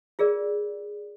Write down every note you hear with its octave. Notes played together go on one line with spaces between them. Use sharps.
F4 G#4 A#4 D5